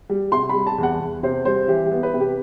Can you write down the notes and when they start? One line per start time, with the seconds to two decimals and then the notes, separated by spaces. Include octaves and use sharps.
0.10 G3
0.32 C3 C6
0.49 B5
0.54 G3
0.67 A5
0.78 E2
0.83 F#5
1.00 E2
1.23 C3 C5
1.45 G3 C5
1.68 E3 G4
1.86 G4
1.91 B3
2.03 B4
2.14 C3
2.20 G4